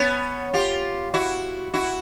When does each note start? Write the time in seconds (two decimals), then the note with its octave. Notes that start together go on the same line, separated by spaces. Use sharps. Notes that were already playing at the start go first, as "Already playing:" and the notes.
Already playing: B3 C#4
0.53 F4 G4
1.14 E4 F#4
1.74 E4 F#4